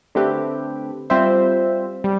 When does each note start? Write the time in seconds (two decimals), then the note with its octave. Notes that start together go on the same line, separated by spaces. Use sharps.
0.15 D3 A3 C4 G4 B4
1.10 G3 C4 F4 C5 E5
2.04 G3